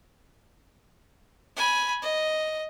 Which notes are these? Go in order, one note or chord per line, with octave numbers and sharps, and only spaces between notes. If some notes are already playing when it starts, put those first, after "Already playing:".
G#5 B5
D#5